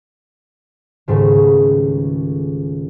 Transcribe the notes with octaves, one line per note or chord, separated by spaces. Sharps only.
C#2 G#2 D#3 G3 A3